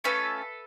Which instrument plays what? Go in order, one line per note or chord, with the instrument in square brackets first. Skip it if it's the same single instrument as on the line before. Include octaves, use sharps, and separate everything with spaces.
[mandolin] A3 C#4 F4 A4 B4